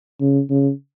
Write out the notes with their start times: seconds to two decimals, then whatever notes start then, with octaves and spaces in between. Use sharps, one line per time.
0.21 C#3
0.50 C#3